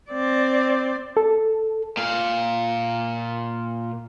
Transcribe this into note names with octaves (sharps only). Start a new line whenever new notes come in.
C4 D5
A4
A#2 F5